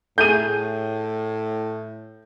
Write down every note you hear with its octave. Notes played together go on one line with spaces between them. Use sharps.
A2 A3 G#4 G6 D#7